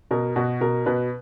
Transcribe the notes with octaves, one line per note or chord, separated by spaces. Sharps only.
B2 A#4
B2 F#4
B2 A#4
B2 B4